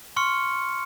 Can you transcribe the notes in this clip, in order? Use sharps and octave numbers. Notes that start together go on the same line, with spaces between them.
C6 C#6 F6 C#7